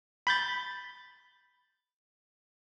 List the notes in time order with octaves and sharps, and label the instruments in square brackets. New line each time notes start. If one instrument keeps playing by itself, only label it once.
[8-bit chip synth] B5 G6 A6